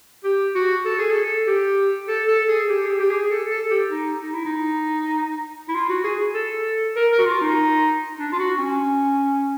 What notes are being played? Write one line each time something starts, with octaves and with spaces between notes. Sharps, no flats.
G4
F#4
A4
G#4
A4
G4
A4
A4
G#4
G4
G#4
G4
G4
G#4
A4
A4
G4
D#4
D#4
E4
D#4
E4
F4
F#4
G#4
A4
A#4
A#4
F#4
F4
D#4
D4
F4
F#4
C#4